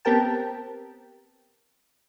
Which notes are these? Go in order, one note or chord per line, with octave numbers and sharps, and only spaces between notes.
B3 C4 G4 A#4 G5 A5